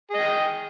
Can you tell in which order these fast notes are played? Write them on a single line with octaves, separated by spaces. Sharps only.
G#4 D#5 G5